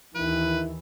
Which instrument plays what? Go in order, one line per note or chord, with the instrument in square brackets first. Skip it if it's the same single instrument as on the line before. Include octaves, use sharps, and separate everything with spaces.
[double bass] D#2 E3 [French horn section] D#3 E4 [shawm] B4